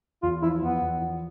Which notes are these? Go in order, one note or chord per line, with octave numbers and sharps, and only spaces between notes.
E2 F4
F3 E4
E2 B3
E2
F3